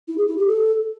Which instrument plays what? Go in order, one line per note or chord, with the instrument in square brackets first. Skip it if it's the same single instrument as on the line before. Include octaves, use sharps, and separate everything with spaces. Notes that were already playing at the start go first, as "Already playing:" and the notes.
[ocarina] E4
G#4
E4
G4
A4